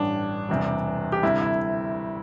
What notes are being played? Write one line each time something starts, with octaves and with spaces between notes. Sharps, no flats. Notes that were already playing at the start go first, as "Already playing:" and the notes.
Already playing: A1 G2 G3 D4
E1 E2 C3 E3 G3
G4
D2 C3 G3 E4
E4